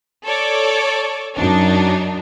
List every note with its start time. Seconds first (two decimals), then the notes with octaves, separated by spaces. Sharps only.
0.25 A4 C#5 D5
1.37 F#2 D4 D#4